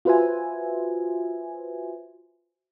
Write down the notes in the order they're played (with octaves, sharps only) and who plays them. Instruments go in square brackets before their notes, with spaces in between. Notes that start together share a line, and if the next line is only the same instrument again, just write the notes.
[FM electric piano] F4 F#4 B4 C5 E5 G#5